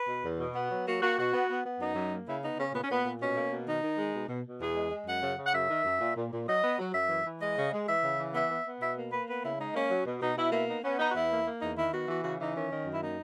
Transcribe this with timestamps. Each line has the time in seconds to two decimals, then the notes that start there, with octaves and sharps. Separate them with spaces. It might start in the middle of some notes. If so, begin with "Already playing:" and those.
Already playing: B4
0.08 B2
0.24 E2
0.40 B2
0.55 B3
0.71 F#3
0.87 A#3 F#4
1.02 A#3 F#4
1.18 B2 F#4
1.33 B3
1.49 B3
1.65 B3
1.80 F#2 D#4
1.95 F#2
2.11 A#3
2.27 C#3 E4
2.43 B3 D#4
2.59 C#3 C#4
2.74 A#2 B3
2.83 C#4
2.89 A#2 B3
3.05 A#2
3.20 B2 C#4
3.36 A#3
3.52 B2
3.67 D#3 D#4
3.83 D#3
3.98 G#3
4.14 B2
4.29 B2
4.45 B2
4.60 E2 G#4
4.76 G#3
4.91 G#3
5.07 F#2 F#5
5.23 C#3
5.38 C#3
5.46 F#5
5.54 F#2 E5
5.70 D#3
5.85 F#2
6.01 A#2
6.16 A#2
6.32 A#2
6.48 F#3 D#5
6.63 B3
6.79 F#3
6.94 F#2 E5
7.09 E3
7.25 E3
7.41 G#3 D#5
7.57 C#3
7.72 G#3
7.88 E3 E5
8.03 C#3
8.19 E3
8.34 B3 E5
8.50 B3
8.65 B3
8.81 B2 E5
8.97 A#3
9.13 A#3 B4
9.28 B3 B4
9.43 C#3 E4
9.59 G#3 D#4
9.75 A#3 C#4
9.91 F#3
10.06 B2
10.22 B2 D#4
10.37 B2 E4
10.52 A#3 E4
10.68 B3 D#4
10.83 B3 C#4
10.99 B3 D#4
11.10 F#4
11.14 E2 E4
11.30 A#3
11.45 A#3
11.62 E2 D#4
11.77 D#3 E4
11.93 B3 F#4
12.08 E3 F#4
12.23 C#3 F#4
12.39 E3 D#4
12.55 D#3 C#4
12.71 D#3
12.86 F#2
12.92 E4
13.02 A#3 D#4